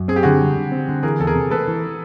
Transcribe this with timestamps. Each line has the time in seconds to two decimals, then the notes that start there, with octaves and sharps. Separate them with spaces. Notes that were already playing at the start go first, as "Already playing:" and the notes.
Already playing: F#2
0.08 C4 G#4
0.16 G4
0.23 D3 F#4 G#4
0.41 G3
0.56 D3
0.72 C4
0.88 D3
1.03 E3 G#4 A#4
1.20 E2 A4
1.27 G#4 A#4
1.35 C3
1.51 A3 A4 B4
1.67 E3